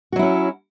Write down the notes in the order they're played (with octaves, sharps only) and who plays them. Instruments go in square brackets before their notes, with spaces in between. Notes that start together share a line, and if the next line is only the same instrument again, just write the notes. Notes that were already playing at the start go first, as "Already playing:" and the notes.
[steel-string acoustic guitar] F#4
F#3
E4
C#4